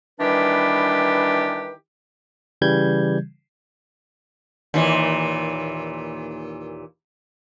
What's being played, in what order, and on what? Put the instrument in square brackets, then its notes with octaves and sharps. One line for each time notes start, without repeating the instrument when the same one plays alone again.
[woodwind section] D#3 E3 G3 D4 G4 B4
[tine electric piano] C#3 E3 G3 G6 G#6
[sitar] D#2 A#2 E3